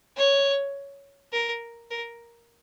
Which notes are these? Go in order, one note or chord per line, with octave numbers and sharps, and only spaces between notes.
C#5
A#4
A#4